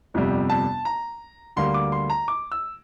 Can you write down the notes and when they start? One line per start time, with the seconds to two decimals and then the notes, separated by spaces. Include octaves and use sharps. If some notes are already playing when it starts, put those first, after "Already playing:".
0.14 G1 F2 C3 G3
0.50 A5
0.85 A#5
1.56 D2 D3 G3 A#3 C6
1.74 D6
1.92 C6
2.10 A#5
2.28 D6
2.52 E6